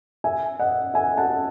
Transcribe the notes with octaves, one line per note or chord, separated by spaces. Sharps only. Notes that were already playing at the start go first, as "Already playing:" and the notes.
E5 G#5
D#5 F#5
E5 G#5
F#5 A5